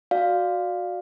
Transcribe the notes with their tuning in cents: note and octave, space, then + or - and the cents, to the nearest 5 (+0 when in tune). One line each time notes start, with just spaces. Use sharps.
F#4 -20 D5 +0 F5 +5